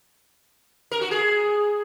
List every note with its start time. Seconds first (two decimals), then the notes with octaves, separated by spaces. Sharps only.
0.91 A#4
1.01 F#4
1.11 G#4